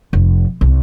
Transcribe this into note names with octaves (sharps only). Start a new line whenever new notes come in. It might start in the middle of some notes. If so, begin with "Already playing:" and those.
F1
C2